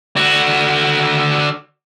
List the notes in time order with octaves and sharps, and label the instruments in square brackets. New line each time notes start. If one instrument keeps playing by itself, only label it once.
[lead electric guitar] D3 F#4